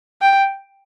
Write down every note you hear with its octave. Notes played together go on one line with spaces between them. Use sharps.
G5